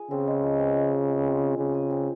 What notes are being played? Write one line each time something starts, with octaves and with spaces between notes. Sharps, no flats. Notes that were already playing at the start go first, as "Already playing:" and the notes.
Already playing: F4 G#4
C#3 C4
G#3
F3
C4
G#3
F3
G#4
C4
C4
C#3 G#4
G#4
C4